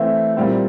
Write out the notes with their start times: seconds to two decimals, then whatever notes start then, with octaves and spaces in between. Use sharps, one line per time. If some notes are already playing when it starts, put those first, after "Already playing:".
Already playing: E3 A3 C4 E5
0.36 A#2 G3 C4 E4